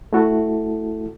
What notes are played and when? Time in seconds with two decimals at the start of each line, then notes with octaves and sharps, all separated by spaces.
0.13 A3 E4 F#4 A4